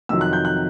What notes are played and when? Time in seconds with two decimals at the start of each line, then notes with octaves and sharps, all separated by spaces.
0.09 F2 C3 D#3 F#3 E6
0.21 F#6
0.33 G6
0.45 F#6